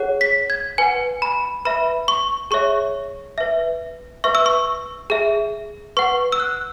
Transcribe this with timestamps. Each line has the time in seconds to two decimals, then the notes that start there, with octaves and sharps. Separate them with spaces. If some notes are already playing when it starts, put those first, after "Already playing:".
Already playing: G#4 C#5 F#5
0.21 B6
0.50 G#6
0.78 B4 F#5 G#5
1.22 B5
1.65 B4 E5 B5
2.08 C#6
2.51 G#4 C#5 E5 C#6
3.38 B4 E5
4.24 B4 E5 C#6
4.35 E6
4.46 C#6
5.10 G#4 E5
5.97 B4 F#5 C#6
6.32 E6
6.40 F#6